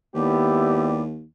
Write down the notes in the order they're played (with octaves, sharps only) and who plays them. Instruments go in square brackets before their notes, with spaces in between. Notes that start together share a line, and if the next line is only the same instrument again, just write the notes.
[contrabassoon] D#2 [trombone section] G#3 B3 G4 [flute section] E4 D5 D6